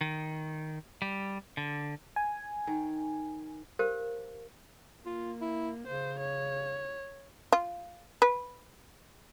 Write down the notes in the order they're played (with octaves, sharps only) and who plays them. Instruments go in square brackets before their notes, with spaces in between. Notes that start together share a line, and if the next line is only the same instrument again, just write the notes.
[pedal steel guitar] D#3
G3
D3
[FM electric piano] G#5
[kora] D#3
[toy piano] G4 A#4 C5 F5
[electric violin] A#3 [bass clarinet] F4
[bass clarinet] E4
[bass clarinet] C#3 [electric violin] C5
[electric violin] C#5
[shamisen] F4
B4